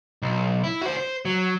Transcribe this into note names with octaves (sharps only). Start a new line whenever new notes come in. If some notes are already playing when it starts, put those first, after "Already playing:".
B1
E4
F#4 C5
C5
F#3